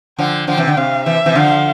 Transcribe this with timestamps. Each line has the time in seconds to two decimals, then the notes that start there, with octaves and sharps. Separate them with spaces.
0.18 D3 F3 G5
0.47 D3 F3 G5
0.57 C3 E3
0.67 D3
0.77 C3 F5
1.06 C3 E3 E5
1.26 C3 E3
1.35 D3 F3 F5